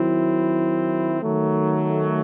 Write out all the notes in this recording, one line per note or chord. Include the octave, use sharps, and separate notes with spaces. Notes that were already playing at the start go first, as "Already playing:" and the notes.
Already playing: D#3 F#3 C4 E4
D#3 F#3 A3